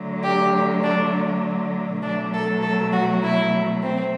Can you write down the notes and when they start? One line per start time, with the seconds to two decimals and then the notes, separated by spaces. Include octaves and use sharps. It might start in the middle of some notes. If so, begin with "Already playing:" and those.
Already playing: D3 F#3 A3
0.23 G4
0.83 D4
2.02 B2 F#3 A3 D4
2.33 A4
2.62 A4
2.92 F#4
3.22 E4
3.82 C4